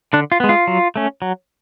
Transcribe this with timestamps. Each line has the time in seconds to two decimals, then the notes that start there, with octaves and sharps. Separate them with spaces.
0.13 D3 D4
0.32 F4
0.40 G#3 B3
0.49 F4
0.67 F#3
0.96 A3 C#4
1.22 F#3